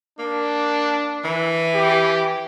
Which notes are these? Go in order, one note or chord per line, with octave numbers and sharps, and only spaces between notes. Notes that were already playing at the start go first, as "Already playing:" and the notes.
A#3 D4
E3
G4